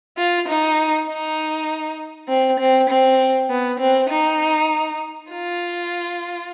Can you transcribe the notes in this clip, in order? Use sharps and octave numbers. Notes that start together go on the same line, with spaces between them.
F4
D#4
D#4
C4
C4
C4
B3
C4
D#4
F4